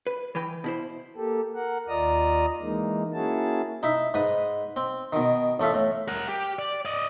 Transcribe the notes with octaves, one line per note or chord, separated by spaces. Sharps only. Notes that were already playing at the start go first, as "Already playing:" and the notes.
B4
E3 B4 G5
B2 E4 C5
A#3 G4 A4
A#4 F#5
D#2 F4 D5 D#5 A#5 D#6
E3 G#3 A#3 D#4
A#3 C#4 E4 F#4 G#4 A5
D#4 E4 E5
G#2 B4 D#6
C4
B2 D#3
A1 A3 A4 E5 F5
A2
A#4 F#5
G4
D5
D5 D#5